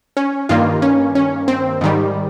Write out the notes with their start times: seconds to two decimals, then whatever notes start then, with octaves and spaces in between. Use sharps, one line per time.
0.17 C#4
0.49 G2 D#3 A#3 F4
0.82 C#4
1.15 C#4
1.48 C4
1.81 G#2 D#3 G3